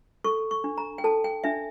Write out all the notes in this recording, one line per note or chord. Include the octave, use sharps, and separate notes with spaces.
A4 C#6
C#6
D4
A#5
G5
A4 A5
G5
D4 E5